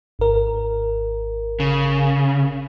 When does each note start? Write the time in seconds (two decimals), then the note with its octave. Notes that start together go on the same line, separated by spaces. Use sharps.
0.19 G#1 A#4
1.60 C#3